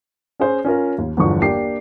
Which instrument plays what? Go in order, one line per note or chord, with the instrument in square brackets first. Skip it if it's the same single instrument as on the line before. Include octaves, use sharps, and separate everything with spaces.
[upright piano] C#4 G#4 C5
C#4 F4 A#4
D#2
G1 E2 D3 F3 C#6
A#3 D4 G4 C7